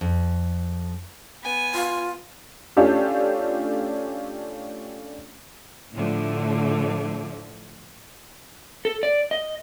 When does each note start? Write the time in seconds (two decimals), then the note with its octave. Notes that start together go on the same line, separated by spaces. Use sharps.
0.01 F2
1.43 B3 G#5
1.74 F4
2.77 A3 C#4 D4 F4 G4 A4
5.94 A2 D3 F3 A3
8.85 A4
9.03 D5
9.31 D#5